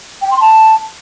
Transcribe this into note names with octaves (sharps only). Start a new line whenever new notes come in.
G5
C6
A5